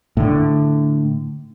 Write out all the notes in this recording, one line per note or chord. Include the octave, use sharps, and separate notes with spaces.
A2 D3